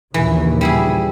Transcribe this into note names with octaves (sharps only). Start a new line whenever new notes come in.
A#1 D#2 C#3 E3
G3 E4 G#4